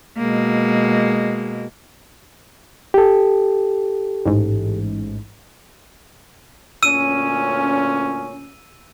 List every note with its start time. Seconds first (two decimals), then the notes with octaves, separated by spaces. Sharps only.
0.18 B2 G#3 A#3
2.94 G4 A4
4.25 A1 G#2
6.83 D2 A#2 C#4 E6 D#7